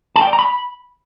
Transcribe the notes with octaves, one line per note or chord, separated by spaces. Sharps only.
A5
G5
D5
A#5
B5